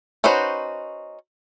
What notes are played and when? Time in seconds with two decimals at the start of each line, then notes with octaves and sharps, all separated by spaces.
0.24 C#4 D#4 F#4 B4 C5